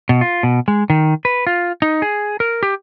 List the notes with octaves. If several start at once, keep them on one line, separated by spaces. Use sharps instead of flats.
B2
F4
B2
G#3
D#3
B4
F4
D#4
G#4
A#4
G4